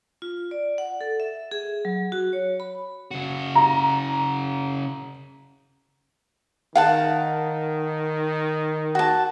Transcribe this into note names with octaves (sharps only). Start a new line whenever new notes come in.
F4
D5
F#5
A4
E5
G#4
F#3
F#4
C#5
B5
C#3 F#4
A#5
D#3 F5 F#5 A5
F#4 A5